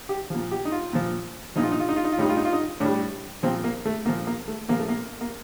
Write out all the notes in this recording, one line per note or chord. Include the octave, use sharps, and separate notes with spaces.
G4
A#2 F3
G4
D#4
F4
A#2 F3
A#2 F3 D#4
F4
D#4
F4
D#4
F4
D#4
F4
A2 G3 D#4
F4
D#4
F4
D#4
A2 G3 D4
A#2 F3 C4
A#3
A3
A#2 F3 A#3
A#3
A3
A#2 F3 A#3
A3
A#3
A#3